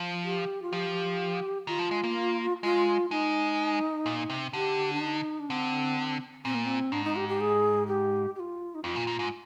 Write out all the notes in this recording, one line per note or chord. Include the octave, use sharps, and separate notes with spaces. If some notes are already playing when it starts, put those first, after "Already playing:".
Already playing: F3
G4
F4
F3 G4
D#3 F4
F3
G#3
A#3
G#3 F4
G#3 D#4
A#2
C3
D3 G4
D4
D#4
D4
D3 C4
A#2 C4
A#3
C4
G#2 D4
D#4
G4
G4
G#4
G4
G4
F4
D#4
F2 F4
A#2
A#2
G#2